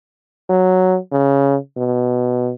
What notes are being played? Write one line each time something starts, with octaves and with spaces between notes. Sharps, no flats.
F#3
C#3
B2